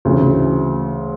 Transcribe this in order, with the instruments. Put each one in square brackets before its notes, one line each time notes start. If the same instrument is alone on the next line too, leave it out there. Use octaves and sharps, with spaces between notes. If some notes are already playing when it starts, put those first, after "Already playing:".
[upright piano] D2 C#3 E3